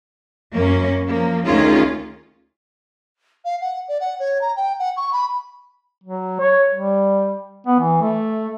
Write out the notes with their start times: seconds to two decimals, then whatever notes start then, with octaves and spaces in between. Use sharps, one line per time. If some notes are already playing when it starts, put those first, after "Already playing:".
0.54 F#2 A#3 C#4
1.08 F3 A#3
1.47 D2 D#3 C#4 F4 G#4
3.45 F5
3.61 F#5
3.88 D5
4.00 F#5
4.19 C#5
4.41 A#5
4.56 G5
4.79 F#5
4.96 C#6
5.12 B5
6.04 F#3
6.40 C#5
6.75 G3
7.67 B3
7.80 E3
8.02 A3